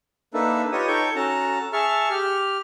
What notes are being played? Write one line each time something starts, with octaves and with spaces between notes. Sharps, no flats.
A#3 D4 D#4 A4 B4 E5
F4 G4 B4 C#5 D#5 D#6
D#4 A4 C#5 G5 C#6 G6
C#4 F#4 A4 A5 A#5
G#4 E5 A5 C#6 F6
G4 F6